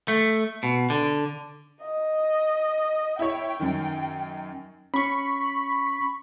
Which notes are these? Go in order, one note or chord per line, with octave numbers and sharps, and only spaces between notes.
A3
B2
D3
D#5
E4 C#5 G5
F#2 D#3
C#4 B5 C#6